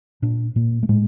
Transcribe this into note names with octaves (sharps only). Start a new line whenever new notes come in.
A#2 D4
A#2 A#3
A3
A2 G#3